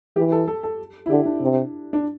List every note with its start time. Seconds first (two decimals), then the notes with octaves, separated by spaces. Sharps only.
0.16 E3 G4
0.32 A4
0.48 A4
0.63 A4
1.06 E4
1.10 D3 G4
1.25 D4
1.41 C3
1.93 D4